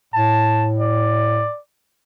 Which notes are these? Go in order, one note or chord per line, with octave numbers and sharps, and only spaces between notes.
A2 A5
D5